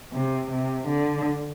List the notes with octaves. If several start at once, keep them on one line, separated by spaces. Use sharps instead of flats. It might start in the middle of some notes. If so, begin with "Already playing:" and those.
C3
C3
D3